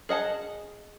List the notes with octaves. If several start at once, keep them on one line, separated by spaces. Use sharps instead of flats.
G#4 D#5 F#5 A5